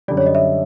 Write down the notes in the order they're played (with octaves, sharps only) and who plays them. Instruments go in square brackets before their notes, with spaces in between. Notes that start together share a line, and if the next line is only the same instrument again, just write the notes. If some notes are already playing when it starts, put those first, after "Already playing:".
[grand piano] F#2 D3 G3 [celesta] D5
[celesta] C#5
D#5
E5